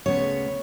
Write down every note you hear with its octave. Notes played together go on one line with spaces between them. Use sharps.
D2 C#3 G#3 B3 C#5